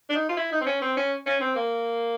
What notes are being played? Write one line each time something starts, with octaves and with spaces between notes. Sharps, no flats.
D4
D#4
F4
E4
D#4
C4
C#4
C4
C#4
C#4
C4
A#3